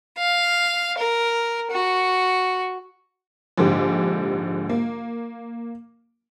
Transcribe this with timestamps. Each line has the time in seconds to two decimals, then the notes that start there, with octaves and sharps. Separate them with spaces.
0.18 F5
0.98 A#4
1.71 F#4
3.57 A#1 G#2 D3 G4
4.69 A#3